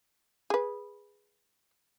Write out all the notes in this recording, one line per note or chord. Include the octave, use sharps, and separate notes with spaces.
G#4 B4